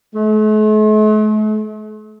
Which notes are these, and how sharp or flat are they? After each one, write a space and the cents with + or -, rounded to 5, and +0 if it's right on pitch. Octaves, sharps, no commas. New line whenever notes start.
A3 -45